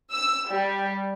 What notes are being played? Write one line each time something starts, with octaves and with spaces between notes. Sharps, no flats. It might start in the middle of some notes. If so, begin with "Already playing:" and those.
E6
G3